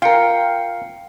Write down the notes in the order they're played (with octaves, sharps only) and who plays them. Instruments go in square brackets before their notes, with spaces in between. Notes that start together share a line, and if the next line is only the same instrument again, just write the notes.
[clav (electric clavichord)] F4 A#4 [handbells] F5 C#7 [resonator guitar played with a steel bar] G5